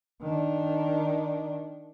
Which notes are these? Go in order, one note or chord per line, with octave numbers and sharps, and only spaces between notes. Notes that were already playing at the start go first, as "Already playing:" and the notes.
D#3 D4